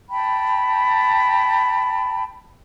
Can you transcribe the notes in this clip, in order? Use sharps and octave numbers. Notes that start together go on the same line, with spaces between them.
G5 A5 B5